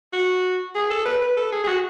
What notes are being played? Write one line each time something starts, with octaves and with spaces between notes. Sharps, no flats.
F#4
G#4
A4
B4
B4
A4
G#4
G#4
F#4